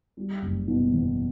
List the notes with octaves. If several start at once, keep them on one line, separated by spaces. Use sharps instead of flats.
G3
F#1
B2
E2